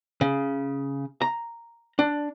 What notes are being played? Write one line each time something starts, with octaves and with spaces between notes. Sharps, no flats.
C#3
A#5
D4